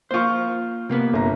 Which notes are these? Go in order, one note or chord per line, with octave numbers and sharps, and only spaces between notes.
A#3 F4 C5 C#6
C3 A#3 B3
G1 A#5